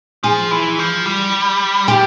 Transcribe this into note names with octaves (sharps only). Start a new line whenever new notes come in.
F3 G#4
E3
F3
G3
F3 G4